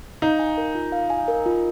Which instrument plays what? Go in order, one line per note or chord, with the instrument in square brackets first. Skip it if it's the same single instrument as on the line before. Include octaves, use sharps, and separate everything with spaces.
[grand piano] D#4 [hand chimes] F5
[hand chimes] G#5
A#4
F4
F5
G#5
A#4
F4